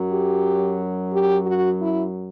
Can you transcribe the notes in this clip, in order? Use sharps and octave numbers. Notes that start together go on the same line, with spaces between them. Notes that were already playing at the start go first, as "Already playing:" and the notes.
Already playing: F#2 F#3
G4
G4
F#4
E4